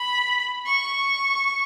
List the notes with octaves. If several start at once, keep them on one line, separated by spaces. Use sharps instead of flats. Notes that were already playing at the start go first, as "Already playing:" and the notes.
Already playing: B5
C#6